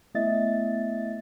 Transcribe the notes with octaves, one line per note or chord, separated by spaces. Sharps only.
A3 B3 E4 D#5 E5 A6